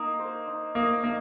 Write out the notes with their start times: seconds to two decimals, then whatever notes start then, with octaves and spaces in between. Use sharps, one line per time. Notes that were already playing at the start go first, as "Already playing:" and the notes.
Already playing: A#3 D#4 D#5
0.19 C5
0.47 D#4
0.75 A#3 D#5
1.03 A#3 D#4